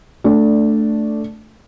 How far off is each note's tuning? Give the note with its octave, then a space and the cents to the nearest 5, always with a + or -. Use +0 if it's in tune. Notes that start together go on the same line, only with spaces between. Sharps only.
A3 +5 D4 -5 D5 +0